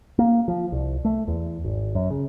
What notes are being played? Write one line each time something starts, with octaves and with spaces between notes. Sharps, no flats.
A#3
F3
C2
A3
E2
G#1
F#2
C#3